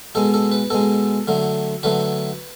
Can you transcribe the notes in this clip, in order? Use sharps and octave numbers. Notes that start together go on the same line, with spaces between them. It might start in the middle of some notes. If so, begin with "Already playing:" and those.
B2 G#3 A4
A4
B4
B2 G#3 A4
D3 F#3 A3
D3 F#3 A3 B4